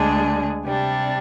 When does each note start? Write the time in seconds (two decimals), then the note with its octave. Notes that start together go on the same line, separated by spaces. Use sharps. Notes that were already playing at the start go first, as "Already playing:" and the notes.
Already playing: D2 D3 G#3 D4 G#4
0.65 C3 G3 D4